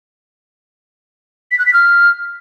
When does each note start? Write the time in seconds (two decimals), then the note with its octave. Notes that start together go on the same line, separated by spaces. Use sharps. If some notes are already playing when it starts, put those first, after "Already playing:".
1.51 B6
1.59 F#6
1.66 B6
1.74 F6